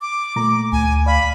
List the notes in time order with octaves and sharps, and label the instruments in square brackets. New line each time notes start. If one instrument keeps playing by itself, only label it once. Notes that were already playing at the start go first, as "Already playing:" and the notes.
[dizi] D6
[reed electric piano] A#2 A3 A#5
[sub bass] D2 [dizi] G#5
[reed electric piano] D5 F5 [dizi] B5